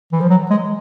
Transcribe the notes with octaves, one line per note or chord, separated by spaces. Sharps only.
E3
F3
F#3
G#3